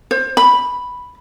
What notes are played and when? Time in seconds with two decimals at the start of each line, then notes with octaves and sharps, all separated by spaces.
0.11 C5
0.37 B5